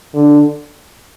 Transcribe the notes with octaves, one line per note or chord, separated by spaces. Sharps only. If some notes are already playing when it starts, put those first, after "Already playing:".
D3